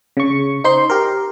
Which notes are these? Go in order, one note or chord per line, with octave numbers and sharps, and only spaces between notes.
C#3 C#6
D#4 C5 C6
G4 A#4